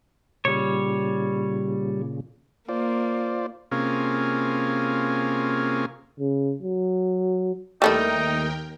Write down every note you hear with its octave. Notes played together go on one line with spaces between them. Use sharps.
A#2 C#3 G3 C#5
A#3 F4 C5 D5
C3 A#3 C#4 F4 G#4
C#3
F#3
D#2 G3 A3 D#4 E4 A#4 G5